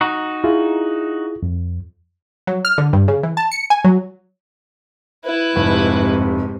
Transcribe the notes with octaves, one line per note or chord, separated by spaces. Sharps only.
D#4 F#4
E4 F4 G#4
F2
F#3
F6
D3
G2
C#3
E3
A5
C#7
G#5
F#3
E4 B4
F1 G#2 C3